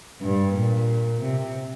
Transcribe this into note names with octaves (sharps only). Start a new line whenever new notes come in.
G2
A#2
C3